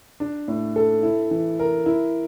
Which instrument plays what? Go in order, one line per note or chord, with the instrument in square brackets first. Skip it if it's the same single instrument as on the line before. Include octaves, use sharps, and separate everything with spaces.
[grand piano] D4
A2
A4
E4
E3
A#4
E4